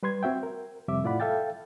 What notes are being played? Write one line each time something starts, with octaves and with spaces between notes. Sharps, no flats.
G3 B4 C6 G#6
C4 F#4 E5 G5
A#4
F2 C3 G3 E5 D6
A2 E4 F4 D5 F#5 B5
A4 E5 F5 G5 A6